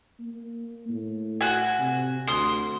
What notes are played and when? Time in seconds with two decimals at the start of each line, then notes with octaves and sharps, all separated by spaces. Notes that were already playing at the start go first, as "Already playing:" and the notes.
0.20 A#3
0.89 A2
1.41 F#4 G#5
1.79 C3
2.28 D2 C6 D#6